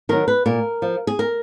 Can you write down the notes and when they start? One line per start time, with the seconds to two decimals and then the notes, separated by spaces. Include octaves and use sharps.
0.09 D#3 F#3 A#4
0.28 B4
0.46 A#2 A#4
0.82 F3
1.07 G#4
1.19 A#4